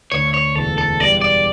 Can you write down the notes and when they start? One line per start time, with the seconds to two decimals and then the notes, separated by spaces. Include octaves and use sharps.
0.12 D2 C#5
0.34 C#5
0.56 E1 A4
0.78 A4
1.00 G3 D5
1.21 D5